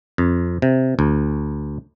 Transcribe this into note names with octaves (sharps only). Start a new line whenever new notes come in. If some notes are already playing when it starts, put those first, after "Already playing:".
F2
C3
D2